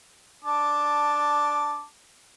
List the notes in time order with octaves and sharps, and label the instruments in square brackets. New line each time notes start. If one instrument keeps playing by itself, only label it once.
[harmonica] D4 A5 D6